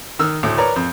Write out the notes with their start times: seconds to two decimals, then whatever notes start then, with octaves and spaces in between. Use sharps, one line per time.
0.19 D#3 E6 F6
0.43 D2 A2
0.57 A#4 B4 C#5 D5 A#5
0.76 F2